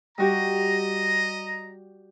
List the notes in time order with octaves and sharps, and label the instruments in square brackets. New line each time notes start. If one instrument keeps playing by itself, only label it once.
[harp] G3 F#4 G4 [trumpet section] D#5 A#5